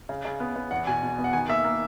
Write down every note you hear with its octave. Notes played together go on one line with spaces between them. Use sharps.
C#3
C#3
B3
B3
E2 F#5
B2 G#5
B2
B3
F#5
D#3 G#5
A#3 E5
A#3